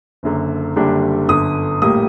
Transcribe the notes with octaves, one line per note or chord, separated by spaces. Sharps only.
F#1 F#2 D3
F#1 F#2 D3 G3 D4
G1 F#2 D3 D#6
A#1 A2 G3 A#3 D#6